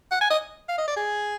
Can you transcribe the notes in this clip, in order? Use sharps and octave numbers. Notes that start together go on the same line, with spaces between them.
F#5
G#5
D#5
F5
D#5
D5
G#4